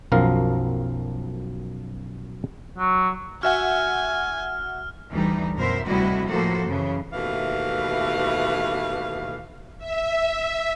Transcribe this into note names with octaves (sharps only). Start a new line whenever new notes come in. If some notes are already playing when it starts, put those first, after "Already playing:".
B1 F#2 F3 A#4 F5
F#3
F#4 E5 F#5 G#5 F6
D2 E3 G3 D#4
F#2 B2 A#4 C5 E5
D2 C3 G3 E4 F#4 D#5
A2 F3 A#3 F#4 A4 C5
F#2 C#3 E3
D#2 B2 E3 A3 F5
E5